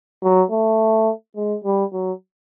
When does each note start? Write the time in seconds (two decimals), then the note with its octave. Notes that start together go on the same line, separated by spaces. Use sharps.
0.23 F#3
0.51 A3
1.36 G#3
1.64 G3
1.92 F#3